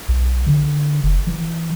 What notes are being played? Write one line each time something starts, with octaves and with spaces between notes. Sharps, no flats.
B1
D3
F1
E3